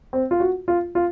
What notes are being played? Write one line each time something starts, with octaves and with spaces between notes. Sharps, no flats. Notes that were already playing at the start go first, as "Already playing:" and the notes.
C4
F4
F#4
F4
F4